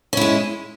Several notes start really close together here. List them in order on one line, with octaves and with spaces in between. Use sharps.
C#4 E4 G#3